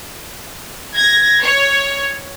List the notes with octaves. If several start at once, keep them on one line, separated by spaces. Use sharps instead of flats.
G#6 A#6
C#5